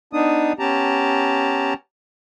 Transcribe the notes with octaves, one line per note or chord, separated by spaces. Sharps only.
B3 D4 D#4 D#6
B3 C#4 G4 A5 A#5